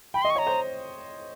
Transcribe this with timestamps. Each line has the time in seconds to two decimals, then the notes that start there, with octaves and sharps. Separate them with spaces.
0.14 G5 B5
0.22 C6
0.25 D#5
0.30 C#6
0.36 C#5
0.38 A#5
0.47 C5